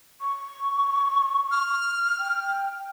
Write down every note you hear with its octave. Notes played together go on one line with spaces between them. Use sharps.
C#6
F6
G5